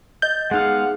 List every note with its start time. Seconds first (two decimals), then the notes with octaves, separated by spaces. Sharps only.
0.22 D#5 G6 A6
0.51 G#3 B3 D#4 G#4 F5 F#5